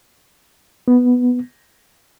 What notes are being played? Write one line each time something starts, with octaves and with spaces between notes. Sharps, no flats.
B3